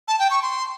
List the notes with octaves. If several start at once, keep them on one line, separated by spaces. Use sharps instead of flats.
A5
G5
C#6
C6